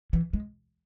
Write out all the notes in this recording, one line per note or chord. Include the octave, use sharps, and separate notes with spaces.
E3
G#3